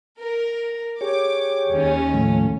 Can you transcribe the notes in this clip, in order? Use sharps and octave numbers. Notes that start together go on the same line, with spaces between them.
A#4
G4 G#4 C#5 D6
D#2 C#4
A2 F3 A3